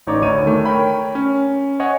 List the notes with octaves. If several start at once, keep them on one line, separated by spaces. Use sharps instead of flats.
A1 D#4 C#5 D5 D6
D2 C#5 D#7
D#3 A3
A#4 C#5 G5 B5
C#4
C#5 D#5 F#5 G#5